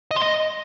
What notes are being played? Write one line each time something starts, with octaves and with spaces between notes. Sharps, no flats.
D#5
C6
D#5